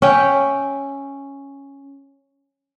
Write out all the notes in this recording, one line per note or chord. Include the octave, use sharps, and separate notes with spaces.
C#4 E5 G5